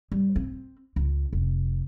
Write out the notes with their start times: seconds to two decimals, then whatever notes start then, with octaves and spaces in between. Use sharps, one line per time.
0.12 G3
0.36 C4
0.96 C#2
1.33 F1